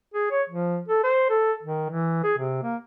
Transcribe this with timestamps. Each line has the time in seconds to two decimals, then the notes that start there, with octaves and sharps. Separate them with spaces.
0.14 G#4
0.31 C#5
0.49 F3
0.88 A4
1.04 C5
1.30 A4
1.63 D#3
1.89 E3
2.24 G#4
2.38 C3
2.63 A#3